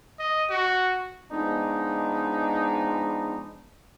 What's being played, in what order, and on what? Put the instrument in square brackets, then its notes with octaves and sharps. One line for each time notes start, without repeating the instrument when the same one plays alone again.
[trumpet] D#5
F#4
[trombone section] F3 G#3 B3 D4 D#4